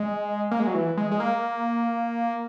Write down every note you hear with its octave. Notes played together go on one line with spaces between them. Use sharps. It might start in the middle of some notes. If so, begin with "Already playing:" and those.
Already playing: G#3
A#3
G#3
F#3
E3
G#3
G#3
A#3